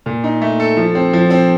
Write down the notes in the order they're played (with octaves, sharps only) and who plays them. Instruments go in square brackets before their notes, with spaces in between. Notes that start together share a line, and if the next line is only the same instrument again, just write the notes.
[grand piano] A#2
D#4
A3
A4
F3
C4
F3
C4